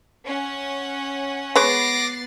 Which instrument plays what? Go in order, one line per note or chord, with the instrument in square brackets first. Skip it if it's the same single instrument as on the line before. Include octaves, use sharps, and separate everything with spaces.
[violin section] C#4 F#5
[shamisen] G#3 B4 C#5 [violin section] B3 A6 C7 [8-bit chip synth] D6 A#6